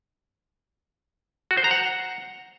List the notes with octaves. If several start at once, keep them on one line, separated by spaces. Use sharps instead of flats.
F#4
C5
A#5
F#5